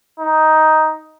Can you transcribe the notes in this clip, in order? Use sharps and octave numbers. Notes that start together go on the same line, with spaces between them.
D#4